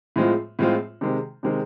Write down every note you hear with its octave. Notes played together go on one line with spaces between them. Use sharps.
A2 F3 G#3 C4 F4
A2 F3 G#3 C4 F4
C3 D#3 G#3 C4
C3 D#3 G#3 C4